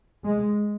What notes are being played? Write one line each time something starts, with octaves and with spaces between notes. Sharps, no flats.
G#3